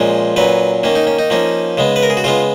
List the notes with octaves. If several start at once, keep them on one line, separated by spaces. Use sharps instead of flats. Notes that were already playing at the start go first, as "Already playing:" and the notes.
Already playing: A#2 F3 G#3 C#4
A#2 F#3 C#4 B4
D#3 A#3 C#4
D#4
C#4
D#4
F3 A#3 C#4
C#3 G#3 B3
B4
A#4
G#4
F#4
C#3 G#3 B3 F4